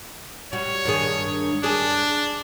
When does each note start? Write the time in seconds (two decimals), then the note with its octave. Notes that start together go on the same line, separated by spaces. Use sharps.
0.53 G3 F#4 C#5
0.85 G2 D#3 G#4
1.64 D4 G#4